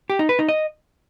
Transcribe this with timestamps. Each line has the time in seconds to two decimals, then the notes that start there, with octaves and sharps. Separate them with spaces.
0.10 G4
0.19 D#4
0.29 B4
0.39 D#4
0.49 D#5